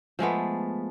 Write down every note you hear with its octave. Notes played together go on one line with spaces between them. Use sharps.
F3 G#3 A3 B3